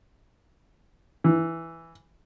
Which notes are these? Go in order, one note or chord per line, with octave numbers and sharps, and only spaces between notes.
E3